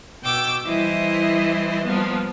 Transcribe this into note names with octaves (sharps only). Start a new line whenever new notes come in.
B2 G5 D6 E6
E3 G3 E4 C5 D#5
F3 G3 A#3 B3